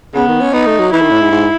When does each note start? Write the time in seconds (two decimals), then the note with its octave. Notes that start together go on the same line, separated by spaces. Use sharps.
0.15 C#3 B3
0.28 D#3
0.41 C#4
0.53 B3 D#4
0.67 A3
0.79 F#3
0.91 E3 E4
1.02 D#3
1.11 A2
1.21 G#2
1.31 G#2